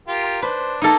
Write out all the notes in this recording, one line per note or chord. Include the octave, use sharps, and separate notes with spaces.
F4 G4 A#4
D4 B4 C5
A#3 D#4 A4